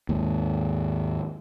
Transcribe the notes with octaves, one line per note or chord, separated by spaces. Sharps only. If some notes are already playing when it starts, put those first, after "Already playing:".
D#2 G#2